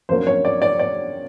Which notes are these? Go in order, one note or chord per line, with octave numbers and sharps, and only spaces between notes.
F2 C#3 F#3 A#3 D4 C5
C#5
D5
D5
D5